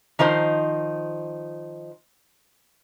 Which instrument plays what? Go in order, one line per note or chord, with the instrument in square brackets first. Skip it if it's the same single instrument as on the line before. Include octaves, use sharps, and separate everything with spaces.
[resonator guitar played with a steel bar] D#3 F3 D#4 C5